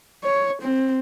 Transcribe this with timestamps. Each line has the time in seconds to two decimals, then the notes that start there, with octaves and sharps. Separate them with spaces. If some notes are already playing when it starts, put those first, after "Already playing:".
0.24 C#5
0.62 C4